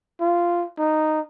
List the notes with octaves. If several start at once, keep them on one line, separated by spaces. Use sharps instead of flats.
F4
D#4